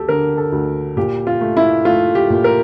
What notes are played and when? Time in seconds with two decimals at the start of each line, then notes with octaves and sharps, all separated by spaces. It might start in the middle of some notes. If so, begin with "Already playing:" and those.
Already playing: D2 G4 A4
0.09 D3 A#4
0.37 A4
0.52 D2
0.97 A#2 G4
1.27 F4
1.41 A3
1.57 E4
1.85 A3 F4
2.15 G4
2.30 A#2
2.44 A#4